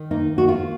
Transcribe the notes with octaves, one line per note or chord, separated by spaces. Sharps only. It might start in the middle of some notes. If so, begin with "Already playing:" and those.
Already playing: D#3
A#3 D#4
A#3 F#4
F4